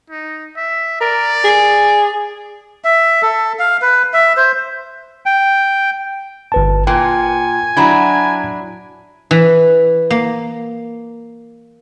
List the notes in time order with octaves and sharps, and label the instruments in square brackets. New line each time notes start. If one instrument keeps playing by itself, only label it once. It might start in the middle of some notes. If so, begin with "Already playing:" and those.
[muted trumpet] D#4
E5
[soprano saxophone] A#4 [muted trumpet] D5
[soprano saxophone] G#4
[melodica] E5
A4
F5
B4
E5
C5
[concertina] G5
[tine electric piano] G1 B4 A5
[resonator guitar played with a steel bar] A#2 [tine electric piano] G5 [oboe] G#5
[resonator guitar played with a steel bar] F#3 D4 E4 [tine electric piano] A#5 B5 G#6
[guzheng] E3
A#3